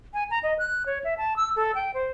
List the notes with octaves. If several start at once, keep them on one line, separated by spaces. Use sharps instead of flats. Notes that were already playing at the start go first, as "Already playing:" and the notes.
G#5
A#5
D#5
F#6
C#5
E5
A5
E6
A4
G5
C5